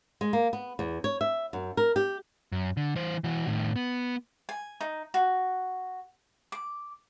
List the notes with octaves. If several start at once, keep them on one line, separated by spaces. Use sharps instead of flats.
G#3
A#3
B3
E2
C#5
E5
F#2
A#4
G4
F#2
D3
E3 C5
E3 F#4
A2 D#3
B3
G#5
D#4
F#4
D6